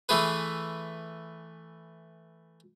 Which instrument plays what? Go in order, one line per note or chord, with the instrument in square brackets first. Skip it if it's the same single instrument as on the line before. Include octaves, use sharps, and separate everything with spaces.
[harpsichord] E3 A3 G#4 B4